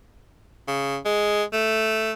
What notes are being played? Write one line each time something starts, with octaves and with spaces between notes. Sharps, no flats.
C#3
G#3
A3